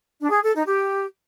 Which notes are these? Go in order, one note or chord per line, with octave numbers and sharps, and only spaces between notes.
D4
G#4
A4
D#4
G4